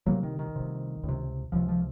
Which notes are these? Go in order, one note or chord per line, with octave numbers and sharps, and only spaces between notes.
C2 C3 F#3 A#3
D#3
D#3
C2 C3
C#2
C3
C#2 C3 F3
F3